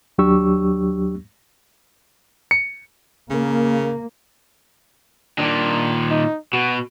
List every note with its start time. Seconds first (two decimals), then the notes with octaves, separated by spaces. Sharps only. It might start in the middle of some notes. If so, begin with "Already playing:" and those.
0.18 D#2 F#3 D4 G4 C#6 E6
2.51 C#7
3.30 C#3 A#3
5.39 A#2 D#3 D4
6.11 D#4
6.53 B2 F#4